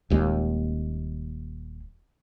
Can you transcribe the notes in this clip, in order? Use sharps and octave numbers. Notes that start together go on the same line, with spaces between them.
D#1 D#2 G#3